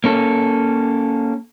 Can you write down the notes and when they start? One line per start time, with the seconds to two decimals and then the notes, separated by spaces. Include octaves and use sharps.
0.04 A#3 C#4 A4